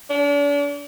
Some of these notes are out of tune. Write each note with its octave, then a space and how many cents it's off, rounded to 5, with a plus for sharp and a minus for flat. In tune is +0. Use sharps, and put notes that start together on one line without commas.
D4 -40